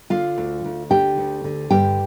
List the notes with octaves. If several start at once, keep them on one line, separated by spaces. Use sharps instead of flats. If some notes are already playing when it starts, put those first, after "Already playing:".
D3 F4 F5
D2
D2
D3 G4 G5
D2
D3
G2 G4 G5